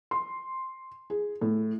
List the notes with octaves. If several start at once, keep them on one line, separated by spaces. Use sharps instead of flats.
C6
G#4
A2